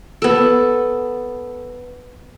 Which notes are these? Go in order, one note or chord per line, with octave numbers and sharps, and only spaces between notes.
B3 A4